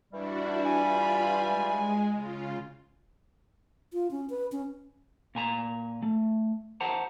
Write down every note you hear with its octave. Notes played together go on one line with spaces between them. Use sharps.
G2 E3 G3 D4 E4 F#4
F4 G#5 B5
G#3
C#3 F4
F4
C#4
B4
C#4
A#2 G#5 A#5
A3
C5 F#5 A5 A#5